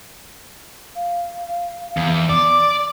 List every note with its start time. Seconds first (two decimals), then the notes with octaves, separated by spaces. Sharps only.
0.96 F5
1.97 E2
2.30 D5 D6